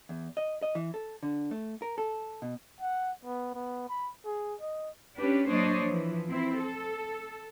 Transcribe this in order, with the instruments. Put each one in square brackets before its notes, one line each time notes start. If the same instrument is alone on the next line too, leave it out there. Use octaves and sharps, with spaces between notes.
[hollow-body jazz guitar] E2
D#5
D#5
E3
A4
D3
A3
A#4
A4
B2
[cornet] F#5
B3
B3
B5
G#4
D#5
[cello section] C#4 D4 G4 B4
F#3 A#3 D4 C5 C#5 D#5
E3 F3
C4 E4
A4